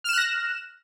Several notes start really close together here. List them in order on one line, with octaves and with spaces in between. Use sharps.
F6 E7 F#6 A#6